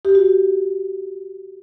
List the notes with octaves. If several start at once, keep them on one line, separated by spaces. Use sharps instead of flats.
G4
F#4